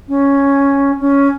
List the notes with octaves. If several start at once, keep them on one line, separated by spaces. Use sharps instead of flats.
C#4
C#4